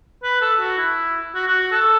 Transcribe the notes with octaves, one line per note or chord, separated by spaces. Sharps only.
B4
A4
F#4
E4
F#4
F#4
F#4
A4